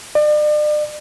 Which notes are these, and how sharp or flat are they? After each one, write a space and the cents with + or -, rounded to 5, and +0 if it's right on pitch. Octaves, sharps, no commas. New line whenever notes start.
D5 +40